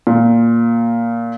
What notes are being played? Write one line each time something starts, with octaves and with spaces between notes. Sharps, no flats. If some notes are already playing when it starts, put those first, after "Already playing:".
A#2